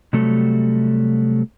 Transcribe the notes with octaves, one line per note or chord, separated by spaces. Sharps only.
C3 F#3 G3 A3 A4